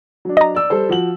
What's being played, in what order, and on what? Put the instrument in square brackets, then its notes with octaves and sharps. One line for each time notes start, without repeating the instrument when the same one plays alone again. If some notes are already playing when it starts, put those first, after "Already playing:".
[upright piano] F#3 D4
[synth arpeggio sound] D#5 A#5
[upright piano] D5 E6
G3 A4 C5
F3 F#4 F#7